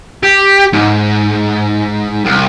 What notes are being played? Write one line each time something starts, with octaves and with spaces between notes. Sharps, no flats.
G4
G#2
C2